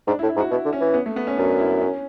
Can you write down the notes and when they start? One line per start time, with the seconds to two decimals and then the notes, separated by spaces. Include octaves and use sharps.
0.07 G#2 D4
0.19 E4
0.23 A2
0.29 E4
0.36 G#2
0.40 F#4
0.51 B2 E4
0.65 D3
0.73 C#4
0.80 E3
0.94 B3
1.06 A3
1.16 B3
1.27 C#4
1.37 F#2 D4
1.59 E4
1.81 C#4